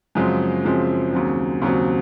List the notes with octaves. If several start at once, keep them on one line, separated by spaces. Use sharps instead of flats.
F#2 C#3 F3 G#3 C4
F#2 C#3 F3 G#3 C4
D#2 C#3 F#3 C4
D#2 C#3 F#3 C4